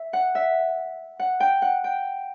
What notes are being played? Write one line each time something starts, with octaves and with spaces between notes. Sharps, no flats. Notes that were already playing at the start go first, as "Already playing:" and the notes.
Already playing: E5
F#5
E5
F#5
G5
F#5
G5